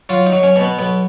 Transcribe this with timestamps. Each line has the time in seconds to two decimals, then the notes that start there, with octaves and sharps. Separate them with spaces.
0.09 F#3 F4
0.26 D#4
0.32 F#3
0.43 C#4
0.56 B2
0.61 B3
0.79 B1 B3